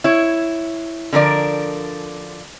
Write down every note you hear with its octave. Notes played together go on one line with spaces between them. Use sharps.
E4 C#5
D3 F3 A#4 D5